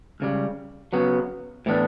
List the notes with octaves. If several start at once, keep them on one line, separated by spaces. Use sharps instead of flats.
C#2 C#3 G3
C#3 F#3 B3
A2 E3 B3 D4